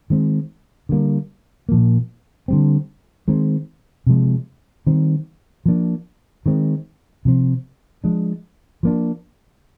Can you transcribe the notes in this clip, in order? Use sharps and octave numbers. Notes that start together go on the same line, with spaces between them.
D#3 G#3 C4
D3 G3 A#3
A#2 F3 A#3
D3 G3 C4
D#3 G#3 C4
C3 F3 G#3
D#3 G3 C4
F3 A#3 D4
D#3 G#3 C4
C3 F3 C4
F3 G#3 D4
F3 A#3 D4